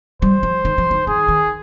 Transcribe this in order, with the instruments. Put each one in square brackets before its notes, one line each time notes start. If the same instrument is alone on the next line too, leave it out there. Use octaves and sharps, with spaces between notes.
[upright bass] G3 [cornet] C5
[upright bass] F3
D#3
F3
D#3
[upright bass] D#3 [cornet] G#4
[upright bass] D#3